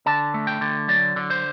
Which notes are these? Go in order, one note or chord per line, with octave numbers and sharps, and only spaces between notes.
D3 A5
A3
G5
D3
F#3 D5
D3
C5